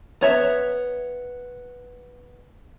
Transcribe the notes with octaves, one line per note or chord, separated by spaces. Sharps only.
B3 C#5 E5